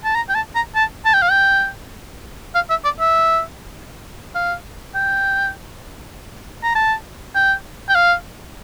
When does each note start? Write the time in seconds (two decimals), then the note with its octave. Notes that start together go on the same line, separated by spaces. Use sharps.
0.04 A5
0.15 A#5
0.29 G5
0.35 A5
0.55 A#5
0.75 A5
1.05 A5
1.14 G5
1.22 F5
1.31 G5
2.55 F5
2.70 E5
2.84 D5
3.00 E5
4.35 F5
4.95 G5
6.63 A#5
6.75 A5
7.35 G5
7.89 G5
7.95 F5